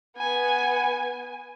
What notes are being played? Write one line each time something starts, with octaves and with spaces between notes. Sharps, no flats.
B3 G#5